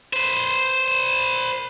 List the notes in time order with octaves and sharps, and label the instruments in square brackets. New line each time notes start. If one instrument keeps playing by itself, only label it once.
[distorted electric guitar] B4 C5